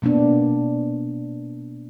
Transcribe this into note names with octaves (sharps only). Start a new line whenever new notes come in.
B2 A#3 B3 D4